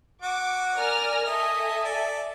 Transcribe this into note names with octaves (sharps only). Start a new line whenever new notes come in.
F#4 D6
A#4 D5 G#5 F6 A#6
A4 D#5 E5 G#5
D5